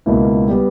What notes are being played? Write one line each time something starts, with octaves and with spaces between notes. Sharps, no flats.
C#2 B2 A#3 E4
G3 B3 G4